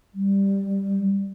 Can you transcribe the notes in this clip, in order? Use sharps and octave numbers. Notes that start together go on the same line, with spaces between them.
G3